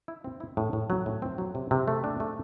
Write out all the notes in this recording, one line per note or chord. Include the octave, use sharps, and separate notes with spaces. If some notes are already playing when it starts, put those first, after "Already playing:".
E4
C4
E4
A2
A2
F#3
A2
C4
F#3
C3
C3
A3
D4
A3